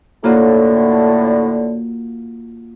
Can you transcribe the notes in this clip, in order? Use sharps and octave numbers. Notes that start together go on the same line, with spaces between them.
A2 D3 A#3 F4 F#4